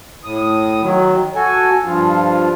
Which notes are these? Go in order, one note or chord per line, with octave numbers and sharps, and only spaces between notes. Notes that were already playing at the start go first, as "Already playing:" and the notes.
A2 D#6
D#3 F#3
F#4 A4 G#5
G2 F3 F4